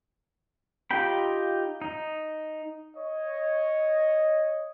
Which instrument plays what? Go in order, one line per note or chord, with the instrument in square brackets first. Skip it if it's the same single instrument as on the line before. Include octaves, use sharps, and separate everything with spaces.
[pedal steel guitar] D#4 F4 G4 G5 B5
D#4
[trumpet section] C#5 D#5